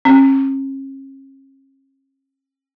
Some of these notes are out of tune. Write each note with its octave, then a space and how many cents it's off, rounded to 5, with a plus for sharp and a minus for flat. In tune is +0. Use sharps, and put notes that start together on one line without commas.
C#4 -40